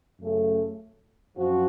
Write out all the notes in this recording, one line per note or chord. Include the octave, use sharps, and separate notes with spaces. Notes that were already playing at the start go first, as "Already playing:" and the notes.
F#2 C#3 A3
F#2 F3 C4 F#4